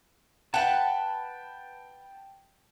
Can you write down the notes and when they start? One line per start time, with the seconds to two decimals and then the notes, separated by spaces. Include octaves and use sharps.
0.54 B4 F#5 G5 A5